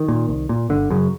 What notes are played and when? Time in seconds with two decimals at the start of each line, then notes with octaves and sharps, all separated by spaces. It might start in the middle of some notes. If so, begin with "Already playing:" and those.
Already playing: D#3
0.08 A#2
0.29 C2
0.49 A#2
0.70 G1 D3
0.91 F#2 C#3